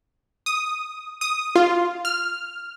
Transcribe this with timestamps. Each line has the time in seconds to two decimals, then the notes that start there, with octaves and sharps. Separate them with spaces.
0.46 D#6
1.21 D#6
1.55 F4
2.05 F6